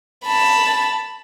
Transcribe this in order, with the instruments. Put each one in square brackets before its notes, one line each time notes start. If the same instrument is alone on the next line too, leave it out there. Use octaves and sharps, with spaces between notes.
[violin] A5 B5